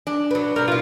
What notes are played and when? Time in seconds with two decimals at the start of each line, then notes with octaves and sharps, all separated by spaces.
0.07 D4
0.31 F#3 B4
0.56 C3 G3 A#4
0.68 B2 E4 F4